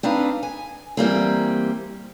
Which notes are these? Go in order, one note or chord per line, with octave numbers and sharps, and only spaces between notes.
C4 D4 D#4 B4 F5
G#5
E3 G3 A#3 C4